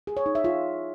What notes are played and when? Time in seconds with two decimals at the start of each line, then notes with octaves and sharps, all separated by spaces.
0.07 G#4
0.17 C#5
0.26 D#4
0.35 E5
0.44 F4